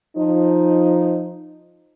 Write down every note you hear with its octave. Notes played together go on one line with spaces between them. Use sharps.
F3 D#4